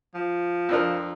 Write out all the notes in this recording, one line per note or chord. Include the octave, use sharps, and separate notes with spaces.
F3
F2 D4 A#4